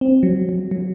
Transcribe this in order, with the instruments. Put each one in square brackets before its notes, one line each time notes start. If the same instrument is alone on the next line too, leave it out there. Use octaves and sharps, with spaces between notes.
[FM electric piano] C4
F#3
F#3
F#3